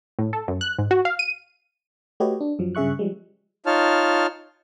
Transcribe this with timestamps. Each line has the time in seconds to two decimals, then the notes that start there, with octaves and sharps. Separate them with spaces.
0.19 A2
0.33 A4
0.48 F#2
0.61 F#6
0.78 G#2
0.91 F#4
1.05 F5
1.19 D#7
2.20 A3 F#4 G4 B4 C#5 D#5
2.40 D4
2.59 F#2 F3 F#3
2.75 G2 C#3 G#4 E5 C#6 F#6
2.99 F3 G3 G#3
3.66 D#4 F4 C#5 A5 F6